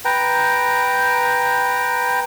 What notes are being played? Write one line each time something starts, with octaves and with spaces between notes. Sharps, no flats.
B4 G5 A#5